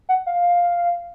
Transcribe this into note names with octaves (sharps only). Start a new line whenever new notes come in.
F#5
F5